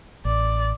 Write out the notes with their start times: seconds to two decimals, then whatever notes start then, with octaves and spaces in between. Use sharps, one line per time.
0.25 A1 D5